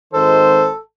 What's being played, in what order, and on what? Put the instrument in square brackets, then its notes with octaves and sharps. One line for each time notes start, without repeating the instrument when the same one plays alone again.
[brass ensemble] G#1 D#3 C5 [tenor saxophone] A4